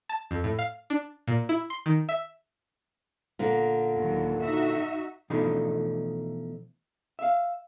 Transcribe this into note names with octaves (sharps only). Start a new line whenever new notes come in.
A5
F2
A2
F5
D4
A#2
E4
C6
D#3
E5
A#2 D3
D#2 F#3
D#4 F#4 E5
B2 E3 F3 A3 D4 D#4
E5 F5